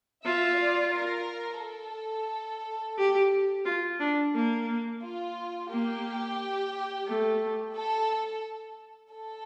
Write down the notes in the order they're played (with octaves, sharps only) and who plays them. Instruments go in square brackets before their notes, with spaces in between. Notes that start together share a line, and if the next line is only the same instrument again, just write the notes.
[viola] F4 [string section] E5
[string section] D5
A#4
A4
[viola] G4
F4
D4
A#3
[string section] F4
[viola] A#3 [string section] G4
[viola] A3
[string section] A4
A4